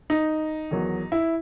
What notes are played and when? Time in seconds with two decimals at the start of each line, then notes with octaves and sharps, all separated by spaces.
0.10 D#4
0.71 E2 D#3 F#3
1.12 E4